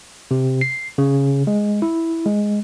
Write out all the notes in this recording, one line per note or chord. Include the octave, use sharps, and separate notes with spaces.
C3
C7
C#3
G#3
E4
G#3